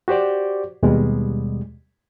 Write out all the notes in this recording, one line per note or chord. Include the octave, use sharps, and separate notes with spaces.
F#4 G4 C5 D5
D#2 B2 G3 G#3